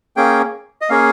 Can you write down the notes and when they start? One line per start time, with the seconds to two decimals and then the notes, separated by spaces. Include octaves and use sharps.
0.17 A#3 C#4 G#4 G5
0.81 D#5
0.89 A#3 C#4 G#4 F5